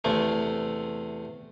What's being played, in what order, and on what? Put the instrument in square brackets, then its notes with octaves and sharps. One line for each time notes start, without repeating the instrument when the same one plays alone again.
[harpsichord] E2 C3 A3